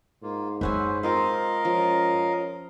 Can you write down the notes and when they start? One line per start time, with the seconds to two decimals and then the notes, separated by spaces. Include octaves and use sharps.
0.23 G#2 A#3 F4
0.61 F#2 G#3 C#4 B4 C5 E5 F#5 G#5
1.03 C4 F4 A#4 C5 D#5 F5
1.65 F3 C#4